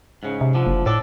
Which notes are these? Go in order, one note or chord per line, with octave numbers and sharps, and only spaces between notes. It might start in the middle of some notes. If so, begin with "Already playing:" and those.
G#2 C#3
C3
D3 F3
F#1
A2 A4 D5